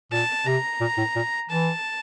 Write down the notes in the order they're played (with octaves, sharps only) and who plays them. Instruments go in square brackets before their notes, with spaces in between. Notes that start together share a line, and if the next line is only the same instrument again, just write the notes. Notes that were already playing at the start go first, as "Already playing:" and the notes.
[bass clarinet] A#2 [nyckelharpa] A5
[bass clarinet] C3 [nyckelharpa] A#5
[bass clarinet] A#2
A2
A#2
[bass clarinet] E3 [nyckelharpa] A5